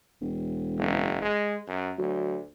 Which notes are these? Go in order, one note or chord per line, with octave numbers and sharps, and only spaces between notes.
E1
F#1
G#3
F#2
D2 F#3